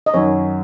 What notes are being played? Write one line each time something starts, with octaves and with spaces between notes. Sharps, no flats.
D#5
F#2 D#3 F#3 C#5